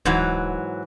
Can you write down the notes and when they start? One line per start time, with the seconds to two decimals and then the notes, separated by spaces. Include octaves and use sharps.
0.05 D1 G#2 E3 F#3